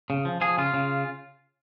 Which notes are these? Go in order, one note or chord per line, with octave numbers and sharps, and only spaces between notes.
C#3
F3
F3 G#4
C#3 F4
C#3